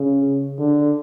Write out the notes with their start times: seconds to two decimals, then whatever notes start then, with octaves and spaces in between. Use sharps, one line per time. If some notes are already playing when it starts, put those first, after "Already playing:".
Already playing: C#3
0.59 D3